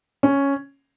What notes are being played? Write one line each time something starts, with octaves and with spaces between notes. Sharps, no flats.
C#4